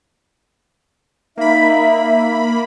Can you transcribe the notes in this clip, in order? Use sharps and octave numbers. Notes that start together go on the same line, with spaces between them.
A#3 D#4 E5 B5